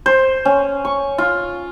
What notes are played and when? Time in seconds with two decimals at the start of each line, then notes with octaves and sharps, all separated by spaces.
0.06 C5
0.45 C#4
0.85 C#6
1.18 F4